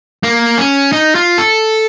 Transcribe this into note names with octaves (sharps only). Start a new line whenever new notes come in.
A#3
C#4
D#4
F4
A4